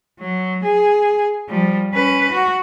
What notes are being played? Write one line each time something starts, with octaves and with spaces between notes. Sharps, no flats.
F#3
G#4
F3 G3
C#4 B4
F#4